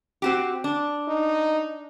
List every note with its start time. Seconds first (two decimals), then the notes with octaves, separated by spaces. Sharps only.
0.22 C4 F#4 G4
0.64 D4
1.08 D#4